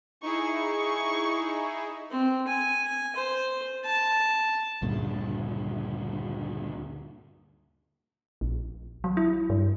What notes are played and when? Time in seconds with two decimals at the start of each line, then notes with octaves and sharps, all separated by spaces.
0.23 D#4 E4 G#4 C#6
2.11 C4
2.47 G#5
3.15 C5
3.84 A5
4.82 D2 G2 A#2 C#3
8.41 A#1
9.04 F#3
9.17 E4
9.50 G2